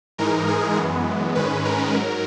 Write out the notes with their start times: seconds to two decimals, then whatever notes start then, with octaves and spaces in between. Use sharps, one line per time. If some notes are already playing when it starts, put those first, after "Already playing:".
0.18 G#2 E3 G#3 D#4 A#4
0.48 G#4
0.76 F#2 E3 G#3 B3
1.35 G#2 D#3 G#3 C#4 B4
1.65 A#4
1.95 G#2 F#3